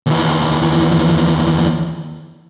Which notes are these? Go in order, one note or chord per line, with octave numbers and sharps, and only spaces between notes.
D#2 E3